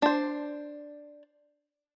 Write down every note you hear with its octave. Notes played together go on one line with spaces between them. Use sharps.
D4 C5